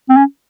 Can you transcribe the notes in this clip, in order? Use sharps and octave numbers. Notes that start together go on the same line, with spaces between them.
C4
C#4